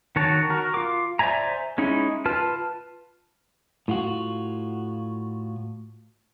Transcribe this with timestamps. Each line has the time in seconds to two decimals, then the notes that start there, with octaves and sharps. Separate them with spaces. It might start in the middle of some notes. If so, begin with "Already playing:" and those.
0.16 D#3 F#4 C#5 A5
0.50 F#4 A#4
0.74 F4 D6
1.19 C5 D5 E5 G#5 A#5
1.78 G#3 C#4 D#4 E4
2.25 F4 B4 A5 F6
3.88 A2 F4 F#4